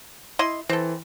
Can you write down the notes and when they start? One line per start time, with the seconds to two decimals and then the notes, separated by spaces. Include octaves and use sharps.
0.39 E4 D#5 C6
0.69 E3 C4 A4